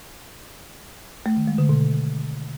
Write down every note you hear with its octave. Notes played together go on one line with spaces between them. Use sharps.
A3
D#3
G#3
D3
B2